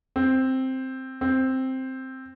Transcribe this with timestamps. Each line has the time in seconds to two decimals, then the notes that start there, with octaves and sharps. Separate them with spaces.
0.16 C4
1.21 C4